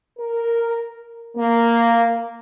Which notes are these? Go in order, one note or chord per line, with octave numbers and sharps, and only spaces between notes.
A#4
A#3